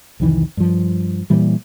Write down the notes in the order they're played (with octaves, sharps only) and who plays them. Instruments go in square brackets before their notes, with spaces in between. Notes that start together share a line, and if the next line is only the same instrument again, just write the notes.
[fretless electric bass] C2 F2 D#3 E3
G2 F3
A#2 E3 G3